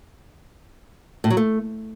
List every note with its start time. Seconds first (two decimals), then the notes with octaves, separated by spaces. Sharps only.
1.24 A2
1.30 F#3
1.37 A3